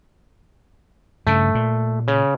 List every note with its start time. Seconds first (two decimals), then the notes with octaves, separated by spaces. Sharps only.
1.27 G2 C#3 A3
1.55 A#2
2.08 C#3